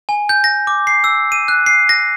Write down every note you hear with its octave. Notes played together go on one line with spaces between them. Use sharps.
G#5
G6
A#6
D6
C7
E6
D#7
F#6
C7
A#6